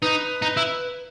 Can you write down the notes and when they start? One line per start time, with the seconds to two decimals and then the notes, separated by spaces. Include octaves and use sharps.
0.02 D#4 B4
0.42 D#4
0.57 E4